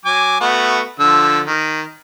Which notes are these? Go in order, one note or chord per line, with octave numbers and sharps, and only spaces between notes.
F#3 G#5 D6
A3 B3 F#4
D3 F3 E6
D#3